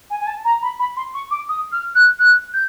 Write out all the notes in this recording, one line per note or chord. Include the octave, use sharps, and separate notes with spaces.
G#5
G#5
A5
A#5
B5
B5
C6
C#6
D6
D#6
F6
F#6
F#6
G6